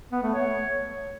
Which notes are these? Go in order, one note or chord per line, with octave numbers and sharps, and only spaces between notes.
B3
A3
C#5